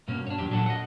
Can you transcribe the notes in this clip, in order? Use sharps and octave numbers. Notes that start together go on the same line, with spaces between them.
G2 B2 A#3 C#4
D4 C#5
E2 F#3 G4
A#2 F#3 D4 A4 F#5
D#5 F#5